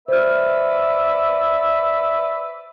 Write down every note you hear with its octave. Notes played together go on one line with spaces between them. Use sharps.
B4 C5 D5 E5 F6